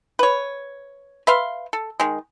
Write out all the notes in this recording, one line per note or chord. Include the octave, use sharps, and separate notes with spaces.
B4 C#5
B4 E5 F5 C6
A4
D#3 G#3